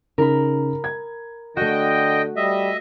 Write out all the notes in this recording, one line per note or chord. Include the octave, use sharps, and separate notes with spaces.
C#3 D#4 A#4 B5
G#6
D3 A3 F#4 D#5 G5
G3 D#5 E5